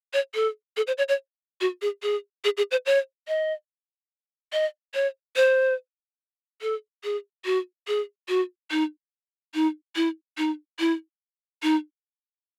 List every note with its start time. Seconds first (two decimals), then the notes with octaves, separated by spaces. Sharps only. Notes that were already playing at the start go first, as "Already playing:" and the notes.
0.13 C#5
0.35 A4
0.77 A4
0.87 C5
0.98 C#5
1.09 C#5
1.61 F#4
1.82 G#4
2.03 G#4
2.44 G#4
2.57 G#4
2.71 C5
2.86 C#5
3.28 D#5
4.53 D#5
4.94 C#5
5.36 C5
6.62 A4
7.04 G#4
7.45 F#4
7.88 G#4
8.29 F#4
8.71 D#4
9.54 D#4
9.96 E4
10.38 D#4
10.79 E4
11.63 D#4